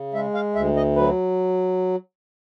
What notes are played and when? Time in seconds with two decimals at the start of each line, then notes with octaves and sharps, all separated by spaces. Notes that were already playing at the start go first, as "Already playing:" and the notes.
Already playing: C#3
0.14 G#3 E5
0.34 F5
0.55 D2 E5
0.76 D#5
0.96 F#3 B4